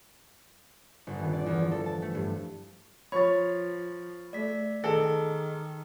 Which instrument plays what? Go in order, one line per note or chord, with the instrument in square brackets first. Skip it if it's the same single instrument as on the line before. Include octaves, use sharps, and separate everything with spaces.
[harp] G1
D#1
D5
E2
F3
A4
A5
A3
G2
[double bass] F3 [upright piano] C#5 [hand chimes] B5 A6
[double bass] A3 [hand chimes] D5 B6
[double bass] D#3 [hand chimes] G#4 [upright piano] A4